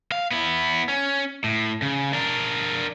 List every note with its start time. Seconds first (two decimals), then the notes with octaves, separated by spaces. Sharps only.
0.12 F5
0.31 B3 E4
0.89 C#4
1.44 A2
1.82 C#3
2.13 D4 A#4